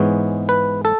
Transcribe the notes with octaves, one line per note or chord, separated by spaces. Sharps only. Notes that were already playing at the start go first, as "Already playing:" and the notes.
Already playing: G#2 E3 G#3 B3 C#5
B4
A4